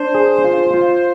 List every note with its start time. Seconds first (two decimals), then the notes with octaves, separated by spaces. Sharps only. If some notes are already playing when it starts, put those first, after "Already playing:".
Already playing: D4 C5
0.15 G#4
0.44 F4
0.74 F4